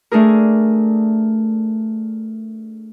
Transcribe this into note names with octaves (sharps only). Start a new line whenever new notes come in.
A3 D4 G#4 A#4